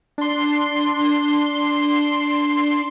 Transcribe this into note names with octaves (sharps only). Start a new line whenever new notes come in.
D4 C6